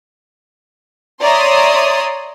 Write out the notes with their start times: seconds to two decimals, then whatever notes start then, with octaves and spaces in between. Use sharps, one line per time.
1.22 C#5 D5 E5 A#5 C6 D#6